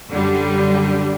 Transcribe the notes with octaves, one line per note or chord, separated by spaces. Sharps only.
F#2 D3 G3